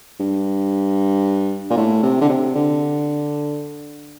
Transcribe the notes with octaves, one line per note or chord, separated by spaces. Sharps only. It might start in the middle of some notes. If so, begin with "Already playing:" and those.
G2
A#2
A2
C3
D3
C3
D3